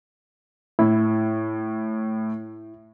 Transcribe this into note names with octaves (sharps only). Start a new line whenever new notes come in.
A2 E4